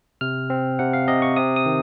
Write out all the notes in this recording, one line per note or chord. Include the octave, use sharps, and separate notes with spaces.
C3 F6
C4
C3 F#5
F5
C3 D#5
C#6
C3 D#6
D#6
D#3